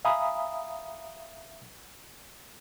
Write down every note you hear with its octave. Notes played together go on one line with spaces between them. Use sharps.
E5 F5 G#5 A#5 B5 D#6